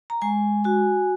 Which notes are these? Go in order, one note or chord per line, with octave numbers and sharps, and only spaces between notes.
A#5
G#3 G#5
F#4 G#5